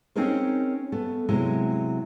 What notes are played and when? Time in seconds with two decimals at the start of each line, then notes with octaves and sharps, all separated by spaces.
0.16 C4 C#4 D#4 G#4 A#4 C5
0.92 A3 B3
1.29 C3 F#3 G#3 E4